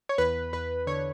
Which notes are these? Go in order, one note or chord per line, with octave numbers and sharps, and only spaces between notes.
C#5
E2 B4
E2 B4
D3 C#5